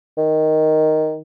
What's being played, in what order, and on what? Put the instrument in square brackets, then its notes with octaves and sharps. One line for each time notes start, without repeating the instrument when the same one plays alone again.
[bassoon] D#3